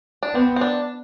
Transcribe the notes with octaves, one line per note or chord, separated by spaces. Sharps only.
D4
B3 C4
C4
D4